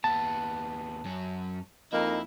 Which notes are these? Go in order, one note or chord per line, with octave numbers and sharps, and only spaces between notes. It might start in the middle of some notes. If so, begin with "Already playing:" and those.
D#2 B3 A5
F#2 C#4
F2 A#3 D#4 E4